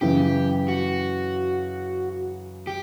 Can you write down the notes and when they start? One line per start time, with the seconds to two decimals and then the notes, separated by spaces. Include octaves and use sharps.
0.01 F#2 C#3 E3 G4
0.68 F#4
2.67 G4